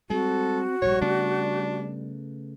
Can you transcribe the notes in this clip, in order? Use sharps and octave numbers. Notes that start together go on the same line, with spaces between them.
G3 G#3 C4 F#4 A4
A#1 G#2 G3 C#5
C#3 A3 B3 D4